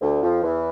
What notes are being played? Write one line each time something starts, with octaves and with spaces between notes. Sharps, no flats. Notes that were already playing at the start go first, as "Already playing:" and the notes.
D2 D3
F2 F3
E2 E3